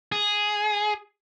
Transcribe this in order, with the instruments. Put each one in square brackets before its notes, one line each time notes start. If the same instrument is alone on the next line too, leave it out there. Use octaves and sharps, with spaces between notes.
[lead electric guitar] G#4